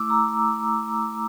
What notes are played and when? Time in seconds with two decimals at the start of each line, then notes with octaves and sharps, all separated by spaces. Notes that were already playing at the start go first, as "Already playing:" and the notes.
Already playing: A3 E4 D6 E6
0.10 A#5